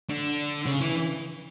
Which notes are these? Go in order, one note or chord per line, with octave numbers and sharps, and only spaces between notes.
D3
C#3
E3